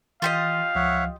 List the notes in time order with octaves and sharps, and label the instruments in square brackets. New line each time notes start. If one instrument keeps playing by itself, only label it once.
[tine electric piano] E3 C6 [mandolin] F4 G4 D#5 [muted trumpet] F5
[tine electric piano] C#2 F3 [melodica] C#5 E5 F#5